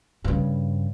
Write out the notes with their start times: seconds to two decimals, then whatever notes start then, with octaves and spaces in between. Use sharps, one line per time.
0.24 G2 C#3